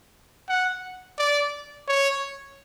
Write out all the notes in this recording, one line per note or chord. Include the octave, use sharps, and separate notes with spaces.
F#5
D5
C#5